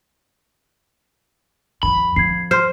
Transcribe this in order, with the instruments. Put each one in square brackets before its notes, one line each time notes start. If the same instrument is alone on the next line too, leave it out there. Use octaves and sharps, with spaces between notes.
[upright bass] F2 F3 [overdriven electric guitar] B5
[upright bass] F2 [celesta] G#6 C7
[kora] C5 [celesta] C6 F6